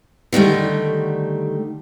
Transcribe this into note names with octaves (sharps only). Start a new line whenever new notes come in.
D3 D#3 G3 A3